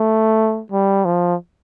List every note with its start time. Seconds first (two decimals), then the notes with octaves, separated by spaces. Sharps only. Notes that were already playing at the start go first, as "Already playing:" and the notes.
Already playing: A3
0.72 G3
1.05 F3